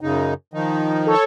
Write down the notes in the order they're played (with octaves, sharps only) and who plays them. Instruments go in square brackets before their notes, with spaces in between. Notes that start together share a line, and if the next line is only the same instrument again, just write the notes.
[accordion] F#2 C#3 D#4
D#3 F3 D#4
[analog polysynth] A4 C#5